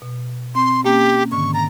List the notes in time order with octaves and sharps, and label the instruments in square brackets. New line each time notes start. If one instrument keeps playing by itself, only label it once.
[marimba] B2
[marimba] C4 [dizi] C6
[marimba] A#3 C#4 [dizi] G4
[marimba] G#2 D3 D#3 [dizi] C#6
[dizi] A#5 [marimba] A6